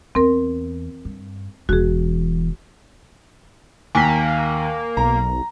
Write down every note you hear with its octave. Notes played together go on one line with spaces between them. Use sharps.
E2 C4 A#4
G2
E1 E3 F#4 G#4
D#2 A#3 G#5 B6
B1 A#5